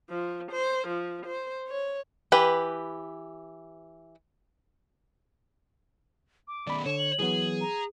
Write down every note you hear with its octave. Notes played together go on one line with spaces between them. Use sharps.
F3
C5
F3
C5
C#5
E3 G4 B4
D6
B2 D#3 D5 B5
D3 C#5 E7
F#7
E3 F#3 B3 G#4
A#5